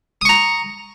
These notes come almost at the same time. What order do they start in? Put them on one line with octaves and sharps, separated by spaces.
D#6 C#6 A#5